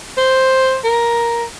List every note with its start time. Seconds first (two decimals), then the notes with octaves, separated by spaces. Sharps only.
0.17 C5
0.84 A#4